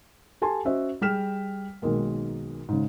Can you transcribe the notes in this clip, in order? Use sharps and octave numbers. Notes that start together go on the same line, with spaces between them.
G4 A4 G#5 A5 C6
C#4 F#4 C5 D#5 E5
G3 G#4 G5 F6 B6 E7
B1 D#3 G#3 A#3
G#2 C#3